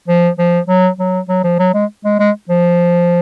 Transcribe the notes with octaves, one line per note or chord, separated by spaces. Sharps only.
F3
F3
F#3
F#3
F#3
F3
F#3
G#3
G#3
G#3
F3